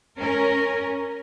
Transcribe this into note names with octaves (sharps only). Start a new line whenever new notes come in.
C#4 A#4